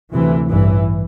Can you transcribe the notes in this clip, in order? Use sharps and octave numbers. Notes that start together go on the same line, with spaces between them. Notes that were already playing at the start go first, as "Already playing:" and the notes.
D2 C3 E3
A1 G2 E3